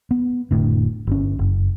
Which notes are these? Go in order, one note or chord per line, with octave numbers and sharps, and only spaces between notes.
B3
F1 A2 D3
G1 C#4
F#1